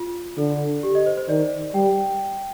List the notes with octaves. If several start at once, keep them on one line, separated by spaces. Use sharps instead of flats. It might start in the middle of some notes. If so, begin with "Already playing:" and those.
Already playing: F4
D3 A4
G4
D#5
C5
C5
D#3 D5
G3 G5